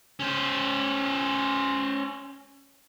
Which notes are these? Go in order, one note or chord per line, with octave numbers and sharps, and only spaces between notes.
C#4 C5